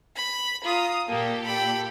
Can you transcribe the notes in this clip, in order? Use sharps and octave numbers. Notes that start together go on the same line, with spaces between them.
B5
F4 A#5 D#6
A#2 A#3 G4 A4
G5 B5